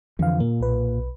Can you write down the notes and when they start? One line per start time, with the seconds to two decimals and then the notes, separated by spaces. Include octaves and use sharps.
0.19 F2 D3 E3 F3 F5
0.40 A#2 A#3
0.60 B1 B4